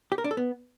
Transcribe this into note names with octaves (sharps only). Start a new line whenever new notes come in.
G4
A#4
D4
A4
B3